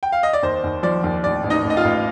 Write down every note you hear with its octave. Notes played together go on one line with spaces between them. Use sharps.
G5
F5
D#5
D5
D#2 C5
D#2
F3 D5
D#2
A1 D5
A1
D#4 D#5
A1
D#5
F4 F5
A1